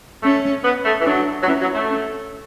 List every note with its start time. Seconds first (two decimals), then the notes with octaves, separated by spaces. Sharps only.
0.23 A3 C#4
0.64 B3
0.85 A3
1.01 E3
1.06 F#3 D4
1.42 F#3
1.47 E3 C#4
1.62 F#3
1.75 A3
1.89 C#4